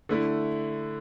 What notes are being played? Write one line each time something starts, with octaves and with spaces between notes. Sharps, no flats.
D3 A3 E4